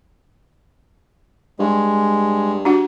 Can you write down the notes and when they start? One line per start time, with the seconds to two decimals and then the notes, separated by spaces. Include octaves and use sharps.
1.59 G2 G#3
2.65 D4 F#4 F#5